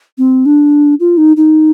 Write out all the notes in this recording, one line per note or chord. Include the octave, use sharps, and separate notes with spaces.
C4
D4
F4
D#4
D#4